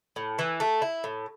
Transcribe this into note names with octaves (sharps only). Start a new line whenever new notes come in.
A2
E3
A3
E4
A2